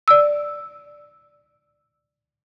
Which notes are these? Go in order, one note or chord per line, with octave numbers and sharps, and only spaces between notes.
D5 E6